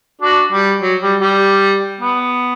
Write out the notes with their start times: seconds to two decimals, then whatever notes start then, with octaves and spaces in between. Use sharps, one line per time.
0.21 D4 F#4
0.52 G3
0.82 F#3
1.02 G3
1.21 G3
2.01 B3